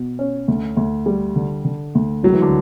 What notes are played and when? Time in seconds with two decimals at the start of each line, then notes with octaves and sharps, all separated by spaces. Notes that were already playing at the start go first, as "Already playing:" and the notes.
Already playing: B2
0.19 C#4
0.48 D2
0.77 D2
1.06 G3
1.36 D3
1.65 D3
1.95 D2
2.23 C#2 F#3
2.33 E3
2.42 D3